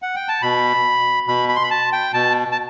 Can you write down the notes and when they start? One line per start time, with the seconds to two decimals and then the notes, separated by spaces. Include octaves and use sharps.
0.02 F#5
0.16 G5
0.28 A5
0.42 B2 B5
1.27 B2 B5
1.49 B5
1.56 C6
1.63 B5
1.70 A5
1.93 G5
2.14 B2 A5
2.52 A5